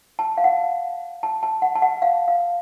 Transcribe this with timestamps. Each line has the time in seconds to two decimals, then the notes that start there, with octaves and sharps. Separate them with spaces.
0.19 A5
0.37 F5
0.44 F#5
1.23 A5
1.43 A5
1.62 F#5
1.75 A5
1.82 F#5
2.02 F5
2.28 F5